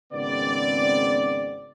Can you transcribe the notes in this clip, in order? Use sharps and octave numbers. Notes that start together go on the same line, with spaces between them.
G#1 C#3 B3 C4 D5